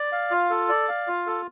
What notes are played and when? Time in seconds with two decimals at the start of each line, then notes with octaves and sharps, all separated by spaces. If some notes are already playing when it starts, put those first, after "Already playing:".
Already playing: D5
0.12 F5
0.31 F4
0.50 A4
0.69 D5
0.88 F5
1.07 F4
1.27 A4